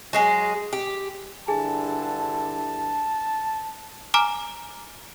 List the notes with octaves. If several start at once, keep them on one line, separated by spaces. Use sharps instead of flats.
F#3 G#3 G#4
G4
G2 D3 E4 G#4 G#5 A5
G#5 A#5 D6 F6